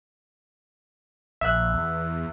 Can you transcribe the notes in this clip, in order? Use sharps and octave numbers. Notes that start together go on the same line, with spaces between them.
A#1 E5 E6 F#6
E2